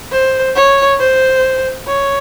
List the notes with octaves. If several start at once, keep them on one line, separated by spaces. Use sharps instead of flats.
C5
C#5
C5
C#5